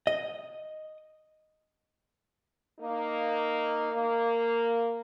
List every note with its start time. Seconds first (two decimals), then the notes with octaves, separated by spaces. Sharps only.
0.07 D#5
2.80 A#3 D#4
3.93 A#3